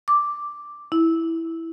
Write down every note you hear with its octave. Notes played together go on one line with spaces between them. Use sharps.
D6
E4